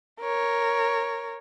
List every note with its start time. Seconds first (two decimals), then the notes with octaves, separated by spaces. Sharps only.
0.21 A#4 C#5